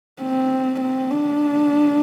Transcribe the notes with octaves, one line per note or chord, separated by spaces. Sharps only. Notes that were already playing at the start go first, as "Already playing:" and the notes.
C4
C4
D4